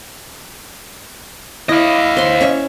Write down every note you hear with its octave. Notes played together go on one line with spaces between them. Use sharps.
E4 D#5 F5
C5 C6
C#4 E5 C#6